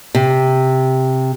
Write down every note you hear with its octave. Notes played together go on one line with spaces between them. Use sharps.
C3